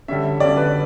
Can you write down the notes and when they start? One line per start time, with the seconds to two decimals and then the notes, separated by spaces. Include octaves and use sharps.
0.08 D3 G3 C#4 E5
0.40 D3 G3 C#4 D5
0.57 B4